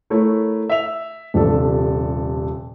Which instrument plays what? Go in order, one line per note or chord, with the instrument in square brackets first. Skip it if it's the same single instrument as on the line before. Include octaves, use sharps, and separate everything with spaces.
[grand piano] A3 E4 A#4 C#5
E5 F7
D#1 C3 F3 D4 A4